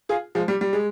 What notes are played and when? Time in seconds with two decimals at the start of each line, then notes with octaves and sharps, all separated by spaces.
0.09 F4 G#4
0.35 F3 G#3
0.48 G3
0.61 G3
0.73 G#3